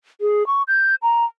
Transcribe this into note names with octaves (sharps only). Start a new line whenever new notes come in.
G#4
C#6
G6
A#5